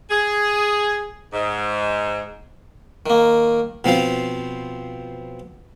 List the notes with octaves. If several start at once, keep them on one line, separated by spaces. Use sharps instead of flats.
G#4
G#2
D#3 A#3
B2 F3 C4 F5